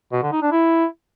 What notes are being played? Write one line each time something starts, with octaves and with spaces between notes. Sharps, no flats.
B2
D3
D#4
D4
E4